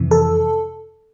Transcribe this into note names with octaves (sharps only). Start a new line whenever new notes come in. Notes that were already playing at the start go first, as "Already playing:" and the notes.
Already playing: F2 C3 E3
A4